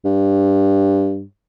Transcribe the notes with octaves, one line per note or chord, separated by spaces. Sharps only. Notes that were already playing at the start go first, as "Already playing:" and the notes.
G2